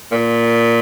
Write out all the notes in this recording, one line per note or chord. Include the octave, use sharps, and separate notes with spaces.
A#2